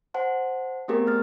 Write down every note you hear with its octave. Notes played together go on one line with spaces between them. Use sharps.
C5 F#5 A5
A3 B3 C4 G4 G#4 A#4
A3 F6 A6